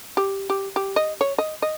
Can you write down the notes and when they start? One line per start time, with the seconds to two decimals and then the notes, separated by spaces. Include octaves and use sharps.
0.17 G4
0.50 G4
0.76 G4
0.96 D#5
1.21 C#5
1.38 D#5
1.62 D#5